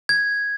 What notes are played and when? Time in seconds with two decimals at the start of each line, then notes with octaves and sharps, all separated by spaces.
0.09 G#6